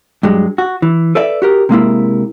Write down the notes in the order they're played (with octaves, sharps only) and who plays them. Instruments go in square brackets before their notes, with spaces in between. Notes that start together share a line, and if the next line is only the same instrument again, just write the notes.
[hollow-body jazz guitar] G2 F#3 G#3
F#4
E3
A4 B4 D5 E5
F#4 G4 A#4
C3 G#3 A#3 E4